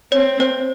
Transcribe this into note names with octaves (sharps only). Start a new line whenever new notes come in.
C4 C#5
C5